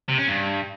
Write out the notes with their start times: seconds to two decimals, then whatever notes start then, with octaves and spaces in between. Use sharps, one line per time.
0.09 C3
0.19 C#4
0.28 G2